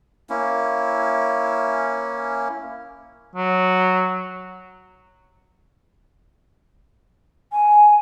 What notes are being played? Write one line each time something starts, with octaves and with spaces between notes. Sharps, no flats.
A#3 C#4 E4
F#3
G#5